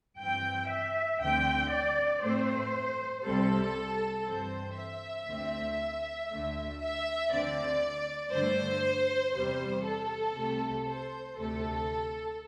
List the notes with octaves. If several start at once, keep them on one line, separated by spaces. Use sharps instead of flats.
G2 E3 C4 G5
E5
D2 D3 A3 C4 G5
D5
A2 A3 C4 C5
C2 C3 G3 C4 A4
G2 E3 C4 C5
E5
D2 D3 A3 C4
D2 D3 A3
E5
D2 D3 C4 D5
G2 D3 A3 C5
E2 C3 G3 C5
A4
C2 C3 A3
C5
D2 C3 A3 A4